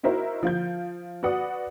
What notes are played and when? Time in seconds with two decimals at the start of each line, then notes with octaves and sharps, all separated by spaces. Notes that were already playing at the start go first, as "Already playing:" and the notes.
0.03 D#4 E4 F#4 A#4 C5 E5
0.43 F3 F4 G6
1.23 F#4 B4 D5 F#5 D#6